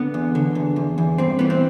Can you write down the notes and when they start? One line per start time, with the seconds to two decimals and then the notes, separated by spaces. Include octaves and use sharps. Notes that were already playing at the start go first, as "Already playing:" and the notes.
Already playing: D3 B3
0.14 E2
0.35 D3
0.55 E2
0.76 E2
0.98 E2
1.18 G2 C4
1.39 E3 B3
1.50 C4